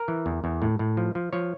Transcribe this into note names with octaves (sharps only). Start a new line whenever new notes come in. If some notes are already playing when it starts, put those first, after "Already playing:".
Already playing: A#4
E3
E2
E2
A2
A2
F3
F3
F3 C#5